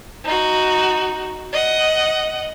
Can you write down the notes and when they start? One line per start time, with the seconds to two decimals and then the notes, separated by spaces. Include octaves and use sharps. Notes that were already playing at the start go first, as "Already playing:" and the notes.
0.24 D#4 F#4
1.53 D#5 F#5